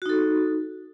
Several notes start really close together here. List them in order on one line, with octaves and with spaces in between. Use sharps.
F#4 D#4 A4